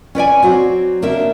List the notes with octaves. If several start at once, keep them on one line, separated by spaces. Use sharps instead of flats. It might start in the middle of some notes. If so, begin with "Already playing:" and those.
C#4 B4 D5 G#5
F#3 C4 F#4 C#5 D5
C#3 A#3 D4 E5